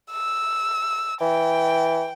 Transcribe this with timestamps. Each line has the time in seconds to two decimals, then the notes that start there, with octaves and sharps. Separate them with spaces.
0.12 E6
1.21 E3 G5